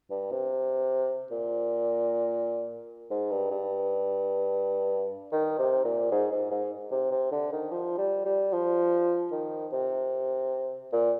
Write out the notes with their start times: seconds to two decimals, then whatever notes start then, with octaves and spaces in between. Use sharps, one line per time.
0.10 G2
0.31 C3
1.31 A#2
3.10 G#2
3.31 G2
3.51 G2
5.32 D#3
5.59 C3
5.84 A#2
6.12 G#2
6.32 G#2
6.51 G#2
6.91 C3
7.11 C3
7.31 D3
7.52 D#3
7.71 F3
7.98 G3
8.25 G3
8.52 F3
9.31 D#3
9.72 C3
10.93 A#2